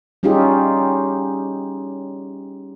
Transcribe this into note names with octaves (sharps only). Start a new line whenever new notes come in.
G3 C#4 D#4 F4 G4 G#4